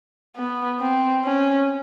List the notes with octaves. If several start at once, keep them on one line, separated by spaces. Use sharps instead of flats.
B3
C4
C#4